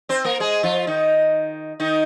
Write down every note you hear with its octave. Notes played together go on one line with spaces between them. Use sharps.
C4 C5
A#3 A#4
G#3 G#4
F3 F4
D#3 D#4
D#3 D#4